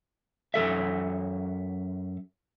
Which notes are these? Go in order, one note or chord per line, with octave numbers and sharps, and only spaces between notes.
F#2 G#3 A4 E5